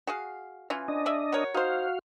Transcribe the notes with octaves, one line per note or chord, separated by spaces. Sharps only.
F#4 G#4 F5
E3 C#4 F4
D4 D#5
G#3 D5 E5
F#4 A#4 C#5
D#4 F#4 C5 F5